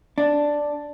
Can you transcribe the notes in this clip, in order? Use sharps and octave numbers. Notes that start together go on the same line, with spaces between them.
D4